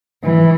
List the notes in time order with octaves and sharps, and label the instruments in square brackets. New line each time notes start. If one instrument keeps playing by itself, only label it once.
[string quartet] E3